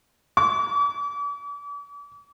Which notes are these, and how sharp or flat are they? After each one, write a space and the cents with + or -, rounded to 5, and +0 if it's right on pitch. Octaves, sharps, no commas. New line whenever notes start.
D6 -45